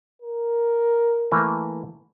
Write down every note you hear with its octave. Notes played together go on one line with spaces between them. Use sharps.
A#4
E3 A3 A#3